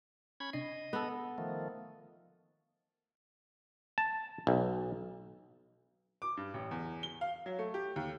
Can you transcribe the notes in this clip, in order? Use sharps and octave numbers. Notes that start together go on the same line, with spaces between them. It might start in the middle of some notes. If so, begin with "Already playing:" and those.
C#4 B5 G#6
C3 D4 D#5 C7
B3 A4
D#3 F3 A3
A5
B1
D6
G2
A1
E2
G7
F5
F#3
A3
G4
D#2